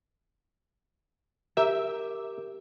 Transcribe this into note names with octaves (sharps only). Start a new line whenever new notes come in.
G4 A#4 E5